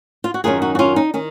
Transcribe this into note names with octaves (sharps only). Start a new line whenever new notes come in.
F4
F#4
F#2 D#3 A#3 C#4 F4 G#4
D#4 F#4
F#4
C#4 F4
D#4
D#3 C#4